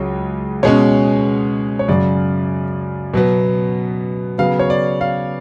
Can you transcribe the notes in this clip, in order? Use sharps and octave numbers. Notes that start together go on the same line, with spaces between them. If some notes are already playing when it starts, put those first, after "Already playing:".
Already playing: C#2 C#3 F#3 C#5
B2 G#3 C#4 C#5
C#5
F#2 C#3 F#3 D5
B2 F#3 B3
C#3 F#3 B3 F5
C#5
D5
F5